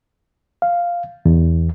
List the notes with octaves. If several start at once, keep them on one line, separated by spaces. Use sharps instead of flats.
F5
E2